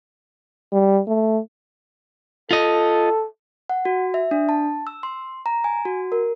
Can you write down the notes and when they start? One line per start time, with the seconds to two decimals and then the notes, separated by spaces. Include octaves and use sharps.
0.73 G3
1.08 A3
2.51 F4 A4 D#5
3.69 F#5
3.85 F#4
4.14 E5
4.31 D4
4.49 A5
4.87 E6
5.03 C6
5.46 A#5
5.64 G#5
5.85 F#4
6.12 A#4